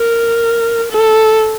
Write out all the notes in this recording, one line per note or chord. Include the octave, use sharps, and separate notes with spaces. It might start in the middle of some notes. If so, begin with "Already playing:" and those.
Already playing: A#4
A4